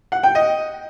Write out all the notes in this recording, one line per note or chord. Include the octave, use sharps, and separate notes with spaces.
F#5
G5
D#5